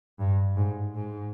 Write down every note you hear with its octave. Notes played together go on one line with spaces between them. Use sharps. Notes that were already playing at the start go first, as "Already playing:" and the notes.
G2
G#2
G#2